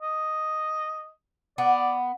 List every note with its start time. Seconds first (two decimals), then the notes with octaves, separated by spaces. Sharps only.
0.02 D#5
1.58 B3 D5